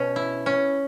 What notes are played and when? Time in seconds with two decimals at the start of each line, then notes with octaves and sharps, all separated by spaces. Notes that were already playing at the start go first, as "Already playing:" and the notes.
Already playing: B2 C#4
0.16 E4
0.46 C#4